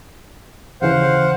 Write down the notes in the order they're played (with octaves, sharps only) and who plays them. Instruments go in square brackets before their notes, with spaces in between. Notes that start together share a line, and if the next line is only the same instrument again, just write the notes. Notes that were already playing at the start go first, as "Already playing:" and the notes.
[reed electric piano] D#2 C#3 E3 [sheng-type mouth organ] C5 F5 F#5